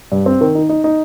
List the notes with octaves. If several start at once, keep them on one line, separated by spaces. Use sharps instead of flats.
G2
C4
D#3
D#4
D#4
D#4